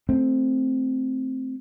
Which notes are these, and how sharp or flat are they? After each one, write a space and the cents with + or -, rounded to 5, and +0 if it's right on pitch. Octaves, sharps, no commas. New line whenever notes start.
A3 +0 C4 +0